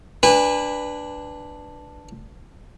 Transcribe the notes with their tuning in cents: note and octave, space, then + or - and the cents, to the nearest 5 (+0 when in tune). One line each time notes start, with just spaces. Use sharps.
D4 +0 B4 +0 G#5 -35